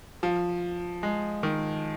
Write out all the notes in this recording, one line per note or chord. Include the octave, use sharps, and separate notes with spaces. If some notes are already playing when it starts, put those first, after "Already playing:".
F3
G#3
D#3